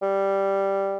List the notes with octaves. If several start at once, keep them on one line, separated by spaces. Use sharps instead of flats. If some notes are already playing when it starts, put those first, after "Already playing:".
G3